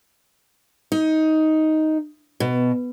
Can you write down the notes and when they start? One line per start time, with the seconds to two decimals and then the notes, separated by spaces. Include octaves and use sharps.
0.92 D#4
2.40 B2